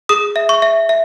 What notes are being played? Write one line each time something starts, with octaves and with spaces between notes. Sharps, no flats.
G#4 D#6
E5
C#6
E5
E5